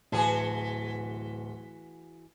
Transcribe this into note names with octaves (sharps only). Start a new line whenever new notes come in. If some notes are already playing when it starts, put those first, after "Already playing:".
D1 E3 F#4 G#4 A5